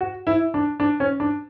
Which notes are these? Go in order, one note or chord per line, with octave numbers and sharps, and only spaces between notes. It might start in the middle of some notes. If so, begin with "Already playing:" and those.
F#4
E4
D4
D4
C#4
D4